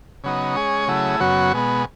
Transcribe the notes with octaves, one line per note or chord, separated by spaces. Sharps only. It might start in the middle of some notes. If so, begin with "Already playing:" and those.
C#3 F#3 B3 D#4
G#3 C#4 G#4 C#5
C#3 F#3 A3 E4 G#4
F#2 C#3 F#3 B3 F#4
B2 G#3 B3